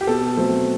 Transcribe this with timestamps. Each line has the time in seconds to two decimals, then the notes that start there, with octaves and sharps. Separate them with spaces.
0.01 G4
0.07 B2 A4
0.37 F#3 A3 C4